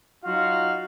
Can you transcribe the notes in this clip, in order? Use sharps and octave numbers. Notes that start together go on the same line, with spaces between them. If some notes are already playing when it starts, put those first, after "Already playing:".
F#3 D#4 F4 F#4 F5